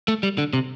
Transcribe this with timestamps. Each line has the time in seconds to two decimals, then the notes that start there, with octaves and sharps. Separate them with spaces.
0.08 A3
0.23 G3
0.38 D3
0.53 C3